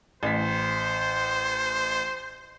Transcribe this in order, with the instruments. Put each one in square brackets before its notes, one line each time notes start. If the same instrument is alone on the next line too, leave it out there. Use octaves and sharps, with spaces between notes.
[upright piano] A1 B6 [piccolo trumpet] C5